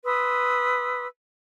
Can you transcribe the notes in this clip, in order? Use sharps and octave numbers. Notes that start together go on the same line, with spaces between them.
B4 C6 D#6 E6